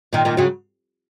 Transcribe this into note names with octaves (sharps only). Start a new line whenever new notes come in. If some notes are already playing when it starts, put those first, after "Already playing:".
A#2 D#3
A#2 D#3
C#3 F#3